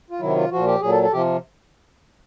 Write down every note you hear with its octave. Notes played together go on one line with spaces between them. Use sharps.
F4
C3 D#3 F#3 E4
F4
A#2 F3 F#4
G4
A#2 F#3 G#4
A4
A4
C3 F3 G4